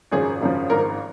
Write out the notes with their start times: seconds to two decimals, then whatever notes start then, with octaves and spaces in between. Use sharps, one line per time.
0.11 G#1 F#2 C#3 F3 G#4
0.41 G#1 F#2 C#3 F3
0.70 G#1 G#2 F3 A#4